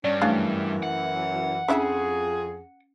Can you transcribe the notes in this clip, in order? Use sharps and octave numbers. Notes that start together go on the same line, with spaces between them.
G2 C#4 D5
F#2 C#3 E3 A3 D4 F5
F#5
F2 C#4 D4 E4 G#4 E5